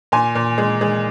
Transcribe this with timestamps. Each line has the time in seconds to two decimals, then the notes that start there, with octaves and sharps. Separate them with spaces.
0.12 A#2 G#5 C6
0.35 A#2
0.58 G#3
0.81 G#3